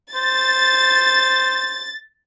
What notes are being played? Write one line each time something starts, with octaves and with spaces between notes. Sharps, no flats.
C5 A6